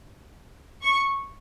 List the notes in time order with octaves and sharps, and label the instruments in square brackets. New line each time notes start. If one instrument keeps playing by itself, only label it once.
[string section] C#6